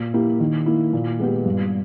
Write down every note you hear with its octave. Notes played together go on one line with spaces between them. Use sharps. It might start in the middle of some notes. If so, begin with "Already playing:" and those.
Already playing: A#2
A#3 E4 G4
D#3
A#3 E4
A#2
G#3 B3 G4
G2